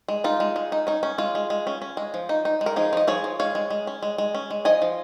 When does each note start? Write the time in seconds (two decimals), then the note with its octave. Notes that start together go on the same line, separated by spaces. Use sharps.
0.08 G#3
0.24 D#4 F4
0.40 G#3
0.56 G#3
0.72 D#4
0.87 C#4 D#4
1.03 C#4
1.18 G#3 F4
1.35 G#3
1.50 G#3
1.67 C#4
1.82 C#4
1.97 G#3
2.14 F3
2.29 D#4
2.45 D#4
2.61 G#3
2.66 A#4
2.76 F3 D#4 G#4
2.93 F3 D#5
3.07 F3 G#4 C#5
3.24 F3
3.39 G#3 C#5 F5
3.55 G#3
3.70 G#3
3.87 C#4
4.02 G#3
4.18 G#3
4.35 C#4
4.50 G#3
4.65 F3 D#5 G#5
4.82 F3